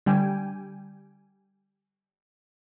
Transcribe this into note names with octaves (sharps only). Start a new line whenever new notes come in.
D3 G3 G5 G#5